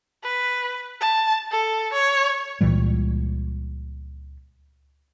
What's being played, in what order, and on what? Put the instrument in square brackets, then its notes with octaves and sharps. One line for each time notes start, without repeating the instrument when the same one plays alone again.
[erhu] B4
A5
A4
C#5
[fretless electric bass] C#2 A#2 E3 G3